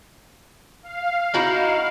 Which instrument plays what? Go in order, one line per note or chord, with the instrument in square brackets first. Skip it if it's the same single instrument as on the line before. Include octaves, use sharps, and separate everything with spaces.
[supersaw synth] F5
[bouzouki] D#4 E4 F#4